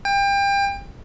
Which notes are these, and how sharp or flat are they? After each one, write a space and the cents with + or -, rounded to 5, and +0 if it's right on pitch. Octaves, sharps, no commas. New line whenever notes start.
G5 +30